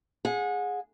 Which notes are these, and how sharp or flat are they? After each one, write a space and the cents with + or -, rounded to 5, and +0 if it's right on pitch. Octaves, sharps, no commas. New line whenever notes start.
G#4 +0 F#5 -30